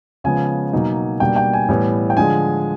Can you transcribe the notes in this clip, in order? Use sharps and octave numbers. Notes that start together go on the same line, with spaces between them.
C#3 F3 G#3 B3 G#5
B2 F#3 A#3 D#4
B2 G3 A#3 D4 G5
G5
G#5
A2 E3 G3 B3 E4
G5
D3 F3 G#3 G#5